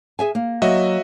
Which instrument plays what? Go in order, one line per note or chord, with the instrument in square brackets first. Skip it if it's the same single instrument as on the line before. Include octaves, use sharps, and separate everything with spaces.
[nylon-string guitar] G#4 E5 G#5
A#3
[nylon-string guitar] F#3 A#3 [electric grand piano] F#4 D#5 E5